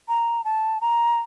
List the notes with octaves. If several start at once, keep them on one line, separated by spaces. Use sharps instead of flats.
A#5
A5
A#5